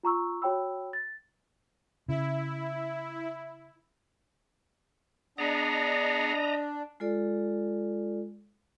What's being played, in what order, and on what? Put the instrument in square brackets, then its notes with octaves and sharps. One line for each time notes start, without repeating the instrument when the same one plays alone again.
[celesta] F4 A#5 C#6 E6
F#4 C#5 G5 B5 E6
A6
[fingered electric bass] C#3 [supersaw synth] E4
[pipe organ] B3 G#4 [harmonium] D4 [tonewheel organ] D#5 A#5
[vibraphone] G#3 F4 A4 D5